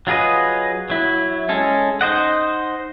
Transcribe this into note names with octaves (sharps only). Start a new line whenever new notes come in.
F#3 F4 G#4 B4 D#5
F#3 E4
G#3 C#4 A4
D#4 C5 D#5 F#5